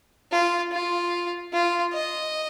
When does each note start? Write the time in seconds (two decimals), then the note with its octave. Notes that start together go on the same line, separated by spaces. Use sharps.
0.32 F4
0.72 F4
1.53 F4
1.93 D#5